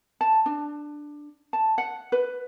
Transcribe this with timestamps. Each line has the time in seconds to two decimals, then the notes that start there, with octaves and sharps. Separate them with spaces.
0.21 A5
0.46 D4
1.53 A5
1.78 F#5
2.12 B4